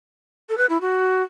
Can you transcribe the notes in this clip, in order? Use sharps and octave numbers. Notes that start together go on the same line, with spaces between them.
A4
B4
E4
F#4